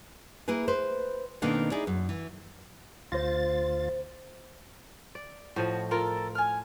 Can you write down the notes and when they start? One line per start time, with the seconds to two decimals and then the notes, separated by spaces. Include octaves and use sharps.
0.48 A#3 E4 G#4 B4
0.68 B4 C5
1.42 B2 D#3 A#3 C4 D4 A4
1.71 D#4 E4 G#4 D5
1.87 F#2
2.09 E3
3.12 D2 F4 C5 A6 A#6
5.15 D5
5.56 A2 F3 F#4 D#5
5.91 F4 A4 A#4
6.35 G#5 F6